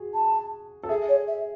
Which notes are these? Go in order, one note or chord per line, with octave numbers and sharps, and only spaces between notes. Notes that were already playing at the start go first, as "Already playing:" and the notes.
Already playing: F#4 G#4
A5
A4
G#4 E5
C#5
E5